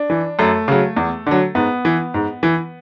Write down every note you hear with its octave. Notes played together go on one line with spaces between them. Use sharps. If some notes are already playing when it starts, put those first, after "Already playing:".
Already playing: D4
E3
F#2 A3
C#3 F#3
E2
D3 F#3
G#2 B3
E3
G#2
E3